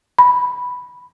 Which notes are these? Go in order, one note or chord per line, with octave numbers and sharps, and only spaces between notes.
B5